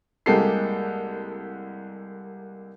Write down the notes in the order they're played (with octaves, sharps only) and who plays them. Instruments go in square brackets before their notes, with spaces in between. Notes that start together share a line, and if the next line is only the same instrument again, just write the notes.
[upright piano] C2 G#3 A#3 G4 A4 C7